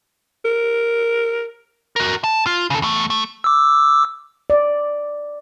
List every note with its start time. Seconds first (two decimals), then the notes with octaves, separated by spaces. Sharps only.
0.45 A#4
1.96 F#4 A#4
2.24 A5
2.46 F4
2.70 C#3 A4
2.82 E2 A3
3.10 A3
3.44 D6 E6
4.50 D5